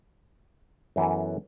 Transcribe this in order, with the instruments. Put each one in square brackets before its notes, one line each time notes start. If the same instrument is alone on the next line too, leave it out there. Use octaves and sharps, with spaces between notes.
[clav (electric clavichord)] F#2 E3 B3 F#4 A4